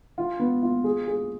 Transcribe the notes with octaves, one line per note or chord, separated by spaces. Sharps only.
F4
B3
F4
G#4
G#4